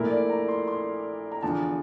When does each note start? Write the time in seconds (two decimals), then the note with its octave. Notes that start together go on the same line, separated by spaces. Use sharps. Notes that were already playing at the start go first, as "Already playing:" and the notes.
Already playing: A#1 A#2 A3 E4 A#4
0.11 D5
0.30 A#5
0.48 C6
0.68 C6
1.32 A#5
1.43 E2 D3 F3 A5